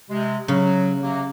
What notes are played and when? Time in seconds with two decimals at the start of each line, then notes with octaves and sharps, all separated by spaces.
0.10 C3 G#3
0.48 C#3 F#3
1.03 C3 F#3 A#3